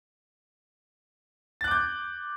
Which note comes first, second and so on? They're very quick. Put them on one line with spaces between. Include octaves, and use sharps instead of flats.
A6 F#6 D6 G6